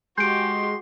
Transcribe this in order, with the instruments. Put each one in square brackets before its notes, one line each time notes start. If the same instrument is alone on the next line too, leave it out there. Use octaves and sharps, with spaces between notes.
[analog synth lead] G#3 [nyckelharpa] F#4 G4 [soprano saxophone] C6 [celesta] G6 D7